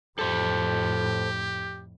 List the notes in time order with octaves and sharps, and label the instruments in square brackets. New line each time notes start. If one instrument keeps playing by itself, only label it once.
[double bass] F2 A2 [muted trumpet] G4 [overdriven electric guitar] A4 C5